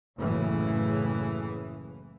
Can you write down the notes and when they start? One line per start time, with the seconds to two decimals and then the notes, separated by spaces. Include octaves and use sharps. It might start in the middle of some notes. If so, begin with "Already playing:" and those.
0.18 F#1 A2 C#3 E3